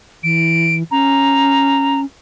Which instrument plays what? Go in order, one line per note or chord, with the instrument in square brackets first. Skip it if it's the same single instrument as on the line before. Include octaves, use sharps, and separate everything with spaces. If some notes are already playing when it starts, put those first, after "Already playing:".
[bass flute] E3 [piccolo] D7
[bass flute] C#4 [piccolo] A#5